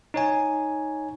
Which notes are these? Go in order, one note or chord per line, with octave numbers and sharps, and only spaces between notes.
D#4 C#5 G#5